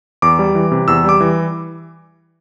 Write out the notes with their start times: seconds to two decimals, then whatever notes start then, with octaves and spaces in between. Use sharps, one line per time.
0.22 E2 D6
0.39 G3
0.55 E3
0.72 C3
0.88 E2 E6
1.04 G3 D6
1.20 E3